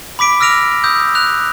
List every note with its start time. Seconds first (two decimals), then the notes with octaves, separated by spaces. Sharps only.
0.19 B5 D6 B6 D7
0.40 E6 F6 A#6 D7 F7
0.84 D#6 E6 G6
1.15 F#6 F7